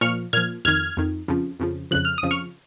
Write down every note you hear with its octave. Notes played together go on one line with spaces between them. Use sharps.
A#2 F3 C#6 F6
A#2 F3 F6 G#6
F2 D#3 F6 G#6
F2 D#3
F2 C#3 F3
F2 C#3 F3
F2 C#3 F3 F#6
F6
D#6
F2 C#3 F3
C#6 F6